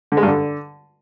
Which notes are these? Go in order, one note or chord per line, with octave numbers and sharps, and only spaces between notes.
D3
G#3
G2
D3